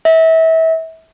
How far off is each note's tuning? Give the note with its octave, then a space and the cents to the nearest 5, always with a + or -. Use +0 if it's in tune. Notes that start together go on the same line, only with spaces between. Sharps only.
E5 -30